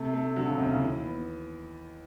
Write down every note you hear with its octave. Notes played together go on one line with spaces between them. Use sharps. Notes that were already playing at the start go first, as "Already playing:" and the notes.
Already playing: C3 A3
A3
D3 F#3
C#3
D#2 C3
C#3
E3
B3